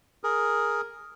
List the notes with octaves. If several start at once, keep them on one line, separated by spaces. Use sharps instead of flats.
G#4 A#4